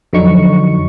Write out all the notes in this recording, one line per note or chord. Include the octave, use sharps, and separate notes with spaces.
F2 D3 F#3 D#4 C#6